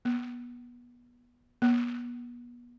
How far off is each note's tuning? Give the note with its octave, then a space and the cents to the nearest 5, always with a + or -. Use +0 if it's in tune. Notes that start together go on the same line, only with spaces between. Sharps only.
B3 -25
B3 -35